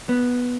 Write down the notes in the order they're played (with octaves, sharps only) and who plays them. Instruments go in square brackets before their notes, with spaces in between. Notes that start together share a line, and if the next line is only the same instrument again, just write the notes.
[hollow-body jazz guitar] B3